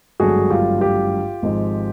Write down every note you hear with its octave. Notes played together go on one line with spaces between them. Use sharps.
G#1 G2 D3 F#3 A3 F#4 G#4
F4 G4
F4 G4
G#1 G#2 F3 G#3